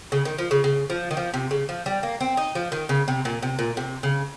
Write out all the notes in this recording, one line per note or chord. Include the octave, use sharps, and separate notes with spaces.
C#3
D#3
F3
C#3
C#3
F3
D#3
F3
C3
C#3
F3
G3
A#3
C4
D#4
F3
D#3
C#3
C3
A#2
C3
A#2
C3
C#3